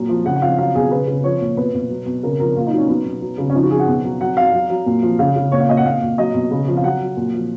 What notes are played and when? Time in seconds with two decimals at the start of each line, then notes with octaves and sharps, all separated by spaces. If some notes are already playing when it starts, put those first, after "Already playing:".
Already playing: A#2 F#3
0.09 F3
0.25 C#3 F#5
0.36 F#5
0.42 F3 F5
0.58 F#3 F5
0.75 B2 G#4
0.91 C#3 B4
1.07 C#3
1.24 F3 C#5
1.41 A#2
1.57 B2 B4
1.74 B2
1.90 F#3
2.06 B2
2.23 C#3 A#4
2.40 F3 A#4
2.56 A#2 F4
2.67 D#4
2.72 F#3
2.78 C#4
2.89 F#3 B3
3.05 B2
3.21 F#3
3.38 C#3
3.50 C#4
3.54 F3 D#4
3.63 F#4
3.71 F3 G#4
3.79 F#5
3.88 B2
4.04 F#3
4.21 F#3 F#5
4.37 F#3 F5
4.53 F#3
4.70 F#3
4.86 A#2
5.03 F3
5.19 C#3 F5
5.36 C#3
5.52 A#2 C#5
5.60 F5
5.69 A#2 D#5
5.77 F#5
5.85 A#2 F5
6.02 A#2
6.18 F#3 D#5
6.34 B2
6.51 C#3
6.68 F3
6.77 F5
6.84 F#3 F#5
7.01 F#3
7.17 A#2
7.34 F3